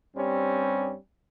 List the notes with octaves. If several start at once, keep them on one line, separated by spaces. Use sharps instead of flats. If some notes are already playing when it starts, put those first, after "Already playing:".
G2 G3 C4 C#4